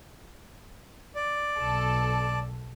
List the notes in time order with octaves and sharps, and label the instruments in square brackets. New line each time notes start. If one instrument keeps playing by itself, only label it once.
[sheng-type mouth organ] D5
[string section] B1 A4